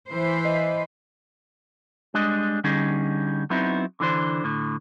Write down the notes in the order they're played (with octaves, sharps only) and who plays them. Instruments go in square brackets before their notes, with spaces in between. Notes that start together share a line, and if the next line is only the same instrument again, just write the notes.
[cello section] E3 B4 C5
[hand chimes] D#5
[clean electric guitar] G3 G#3 D4 D#5
D3 G3 C#4 D#4 G#4
F#3 B3 C4 D#4 E4
D3 E3 D4 C5
A2 D3